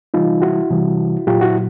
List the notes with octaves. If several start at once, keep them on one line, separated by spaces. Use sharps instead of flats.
C3 E3 G3 D#4 F4
E4 F#4
C3 E3 G3
A#2 F#3 F4 G4
E4 F#4